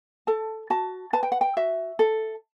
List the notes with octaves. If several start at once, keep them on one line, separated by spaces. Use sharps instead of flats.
A4 A5
F#4 A5
B4 A5
G5
F#5
G5
F#4 E5
A4